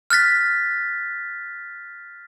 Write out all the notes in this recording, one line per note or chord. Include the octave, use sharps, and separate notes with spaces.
F6 F#6 A6 B6